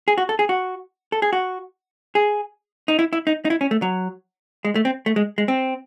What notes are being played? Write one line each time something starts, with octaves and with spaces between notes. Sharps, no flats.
G#4
F#4
A4
G#4
F#4
A4
G#4
F#4
G#4
D#4
E4
E4
D#4
D#4
E4
C#4
A3
F#3
G#3
A3
C4
A3
G#3
G#3
C4